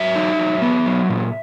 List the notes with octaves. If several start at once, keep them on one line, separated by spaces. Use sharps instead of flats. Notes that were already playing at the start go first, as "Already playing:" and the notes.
Already playing: F#3 E5
D#4
F#3
B3
F#3
A#2